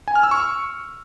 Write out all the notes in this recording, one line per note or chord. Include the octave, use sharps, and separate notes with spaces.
G#5
F6
E6
C#6